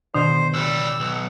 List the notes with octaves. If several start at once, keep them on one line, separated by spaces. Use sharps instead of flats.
B2 D3 D#3 C5
C#2 G3 E6
B1